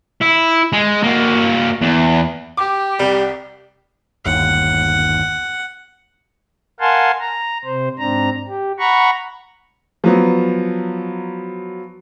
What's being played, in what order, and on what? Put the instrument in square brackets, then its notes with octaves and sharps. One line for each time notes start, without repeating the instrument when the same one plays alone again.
[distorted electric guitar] E4
G#3
A#3 F#4
E2
[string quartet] G4 [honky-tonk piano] D6
[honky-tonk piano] C2 [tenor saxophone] G3
[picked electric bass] G1 D#2 [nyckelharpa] F#5
[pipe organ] A#4 F5 F#5 G#5 A5 C6
A#5
C3 C5
G#2 C4 D4 A#5
G4
F#5 A#5 B5 C#6
[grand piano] F3 F#3 B3